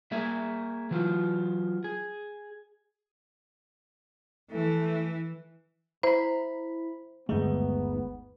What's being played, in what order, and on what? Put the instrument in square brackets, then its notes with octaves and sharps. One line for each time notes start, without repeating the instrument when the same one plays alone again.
[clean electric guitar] A#3 G#4 E5
E3 F#3 F4
G#4
[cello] E3 [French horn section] A3
[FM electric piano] E4 B5 [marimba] C5 [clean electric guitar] A#5
[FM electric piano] G1 D#2 G#3 [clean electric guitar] A3 D#4 [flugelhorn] B3